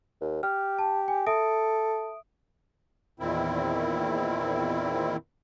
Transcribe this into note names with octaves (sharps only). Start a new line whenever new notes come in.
D#2
G4 F6
A5
G#5
A4 E5 D#6 D7
E2 A#2 D#3 C4 E4